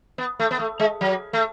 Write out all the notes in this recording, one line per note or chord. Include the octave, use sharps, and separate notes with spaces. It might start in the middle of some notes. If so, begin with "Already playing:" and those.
B3
A3
B3
A3
G#3
F#3
A3